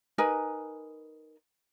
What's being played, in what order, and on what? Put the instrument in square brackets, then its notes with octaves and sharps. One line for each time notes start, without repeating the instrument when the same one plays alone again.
[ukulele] D#4 A#4 B4 G#5